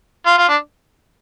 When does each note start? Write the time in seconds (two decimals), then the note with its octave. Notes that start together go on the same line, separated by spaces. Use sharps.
0.26 F4
0.38 F4
0.49 D4